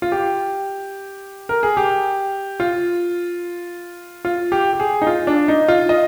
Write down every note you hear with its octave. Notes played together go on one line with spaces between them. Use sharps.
F4
G4
A#4
G#4
G4
F4
F4
G4
G4
G#4
D#4
F4
D4
D#4
F4
D#5